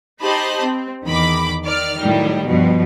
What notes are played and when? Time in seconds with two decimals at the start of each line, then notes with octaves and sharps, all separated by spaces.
0.21 D#4 G4 C5 D#5 A5 B5
0.64 C4
1.05 E2 D#3 B5 D6
1.64 D#3 D5 F6
1.99 A2 D#3 F#3 G3
2.46 G2 B2 F3